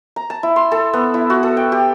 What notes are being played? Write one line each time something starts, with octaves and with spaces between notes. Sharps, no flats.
A#5
A5
E4
C6
A4
B3
E4
F#4
A4
G5
G4